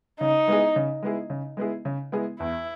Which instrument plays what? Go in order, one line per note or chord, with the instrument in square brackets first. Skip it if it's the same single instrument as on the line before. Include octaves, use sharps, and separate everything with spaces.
[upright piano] C#3 [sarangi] D#4
[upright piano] G#3 B3 E4 G#4
C#3
G#3 B3 E4 G#4
C#3
G#3 B3 E4 G#4
C#3
G#3 B3 E4 G#4
[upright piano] E2 [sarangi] E4